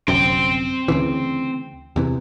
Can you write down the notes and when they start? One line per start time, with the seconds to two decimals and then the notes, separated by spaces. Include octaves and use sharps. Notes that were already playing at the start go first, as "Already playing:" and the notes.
0.08 G1 C2 F#2 C4 G5
0.88 D2 C#3 E3
1.96 E2 C3 E3